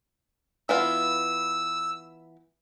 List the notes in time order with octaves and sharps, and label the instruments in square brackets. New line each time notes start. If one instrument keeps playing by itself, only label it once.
[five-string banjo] E3 B3 F4 [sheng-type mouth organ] E6